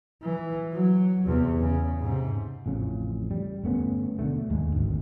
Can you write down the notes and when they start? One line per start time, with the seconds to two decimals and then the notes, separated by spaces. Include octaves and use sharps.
0.23 E3
0.73 F#3
1.27 E2 C3
1.59 C#3
2.01 G#2 C3
2.66 A1 F2 C#3
3.31 G3
3.63 G1 A3 B3 C#4
4.19 B2 D3 A3
4.50 D#2 G#2 G#3
4.72 G#1 D2